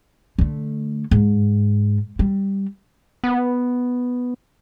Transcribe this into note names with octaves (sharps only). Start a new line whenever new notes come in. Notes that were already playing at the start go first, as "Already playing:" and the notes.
D3 A3
G#2
G3
B3